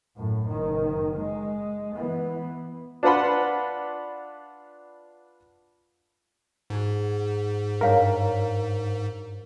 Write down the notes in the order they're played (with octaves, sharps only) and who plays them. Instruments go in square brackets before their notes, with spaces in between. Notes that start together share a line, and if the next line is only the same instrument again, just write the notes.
[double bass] F#2 A2
F#1 D#3
G#3
E3 B3
[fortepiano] D4 F4 B4 F#5 B5 C6
[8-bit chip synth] G#2 [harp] F#4 G#4 G#5
[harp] G2 [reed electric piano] A#4 [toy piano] C#5 F5 G5